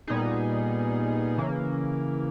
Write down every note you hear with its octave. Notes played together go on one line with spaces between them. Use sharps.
A#2 G3 B3 D#4 G#4
C#3 E3 A#3